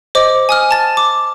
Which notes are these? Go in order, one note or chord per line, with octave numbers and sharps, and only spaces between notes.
C5 D#5 D6
G#5 D#6 F6
A5 A6
D6